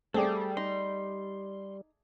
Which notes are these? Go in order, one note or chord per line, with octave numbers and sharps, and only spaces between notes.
G3 A3 C4 G#4 A4 D5
D#4 C6